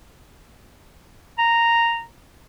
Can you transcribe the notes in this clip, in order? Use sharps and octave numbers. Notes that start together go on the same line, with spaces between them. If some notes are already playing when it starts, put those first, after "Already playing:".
A#5